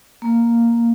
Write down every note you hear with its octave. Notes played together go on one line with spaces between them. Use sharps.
A#3